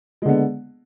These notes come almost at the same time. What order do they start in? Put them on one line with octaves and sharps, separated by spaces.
G#3 D3 B3